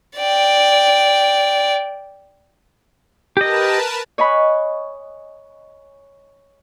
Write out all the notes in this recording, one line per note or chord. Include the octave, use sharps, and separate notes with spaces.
D5 G5
G4 A#4 B4 D#5 A5
C#5 D#5 G#5 B5 F#6